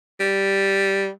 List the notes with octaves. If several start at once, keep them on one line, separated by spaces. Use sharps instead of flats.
G3